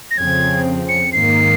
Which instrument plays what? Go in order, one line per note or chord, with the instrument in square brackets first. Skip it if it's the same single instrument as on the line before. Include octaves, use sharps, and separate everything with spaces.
[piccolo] A#6
[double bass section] F2 C#3 F3 C4 [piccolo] G#6
[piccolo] C#7
[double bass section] G#2 D#3 A#3 [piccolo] C7